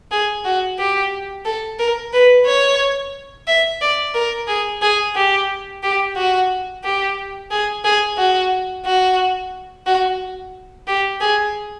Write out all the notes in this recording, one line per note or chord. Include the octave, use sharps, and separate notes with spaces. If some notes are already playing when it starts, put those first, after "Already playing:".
G#4
F#4
G4
A4
A#4
B4
C#5
E5
D5
A#4
G#4
G#4
G4
G4
F#4
G4
G#4
G#4
F#4
F#4
F#4
G4
G#4